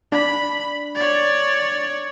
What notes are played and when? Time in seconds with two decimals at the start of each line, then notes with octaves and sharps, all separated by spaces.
0.12 D4 B5
0.95 C#5 D5